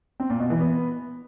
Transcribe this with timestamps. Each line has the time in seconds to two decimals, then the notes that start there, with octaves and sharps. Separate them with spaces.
0.20 C4
0.30 A#2
0.40 B2
0.50 E3
0.60 B3